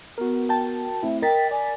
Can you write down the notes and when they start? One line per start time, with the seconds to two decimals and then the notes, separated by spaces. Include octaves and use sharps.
0.18 B3 F#4 A#4
0.49 G5 A5
1.03 A3 C4 E4 E5
1.22 A#4 D#5 G5 A6 B6
1.51 D5 G#5